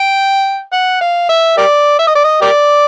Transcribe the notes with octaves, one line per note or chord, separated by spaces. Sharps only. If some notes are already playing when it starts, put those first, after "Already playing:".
Already playing: G5
F#5
F5
E5
G4 A#4 D5
E5
D#5
D5
D#5
G4 A#4 D5